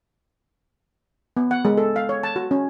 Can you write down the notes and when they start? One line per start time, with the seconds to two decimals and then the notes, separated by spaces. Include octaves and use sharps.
1.37 B3
1.51 F#5
1.65 G#3
1.77 A4
1.96 F5
2.09 C#5
2.23 A5
2.36 F#4
2.51 C#4